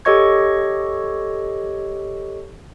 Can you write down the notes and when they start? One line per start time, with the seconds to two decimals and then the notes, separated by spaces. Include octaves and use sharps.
0.05 G4 A4 C#5 D#5 C#6 G#6